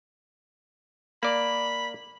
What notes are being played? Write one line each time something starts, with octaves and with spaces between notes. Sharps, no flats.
A#3 D5 B5